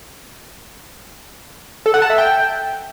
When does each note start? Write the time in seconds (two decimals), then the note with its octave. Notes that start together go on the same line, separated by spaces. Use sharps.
1.86 A4
1.94 F#5
2.02 A5
2.10 E5
2.18 G5